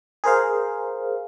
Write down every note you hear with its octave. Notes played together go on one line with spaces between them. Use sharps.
G#4 A#4 C5 F5